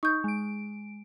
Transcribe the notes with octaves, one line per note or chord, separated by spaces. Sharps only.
D#4 C#6 G6
G#3 D7